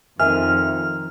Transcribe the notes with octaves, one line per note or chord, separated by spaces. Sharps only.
F2 D#3 E5 G#5 F6